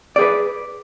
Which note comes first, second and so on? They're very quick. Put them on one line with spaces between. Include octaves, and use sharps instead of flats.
D5 G#4 B4